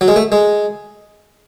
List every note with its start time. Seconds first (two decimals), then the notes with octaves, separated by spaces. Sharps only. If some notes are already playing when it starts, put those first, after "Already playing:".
0.01 F#3
0.08 G#3
0.16 A3
0.32 G#3